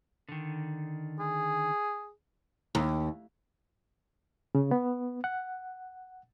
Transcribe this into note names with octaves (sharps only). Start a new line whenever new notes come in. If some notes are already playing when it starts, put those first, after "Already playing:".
D3 D#3
G#4
D#2
C#3
B3
F#5